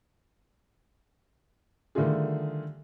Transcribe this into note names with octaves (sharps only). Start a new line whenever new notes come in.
D3 D#3 G3 A3 F4 G#4